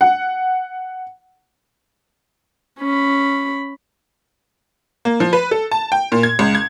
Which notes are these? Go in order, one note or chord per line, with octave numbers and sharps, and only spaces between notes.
F#5
C#4 B5
A#3
F3
B4
A4
A5
G5
A#2
G#6
C#2
G#6